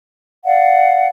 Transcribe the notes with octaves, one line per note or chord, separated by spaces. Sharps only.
D5 F5 F#5